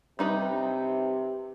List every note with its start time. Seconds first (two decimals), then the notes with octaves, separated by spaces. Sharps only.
0.19 C3 G3 D#4 B4